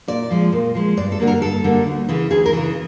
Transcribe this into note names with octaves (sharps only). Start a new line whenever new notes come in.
A#2 D5
F3 G#3
A#2
F3 G#3
G2 D5
A4
D3 G3 A#3
A#4
G2 A4
D3 G3 A#3
D2
C#3 E3
D2 G#4
A#4
C#3 E3